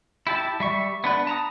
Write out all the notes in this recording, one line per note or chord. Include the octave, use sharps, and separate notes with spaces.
E4 G4 A5
G3 E5 C#6
B3 D4 B4
A5 A#5 D#6